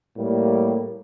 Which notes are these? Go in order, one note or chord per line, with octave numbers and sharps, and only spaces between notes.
A2 G3 A#3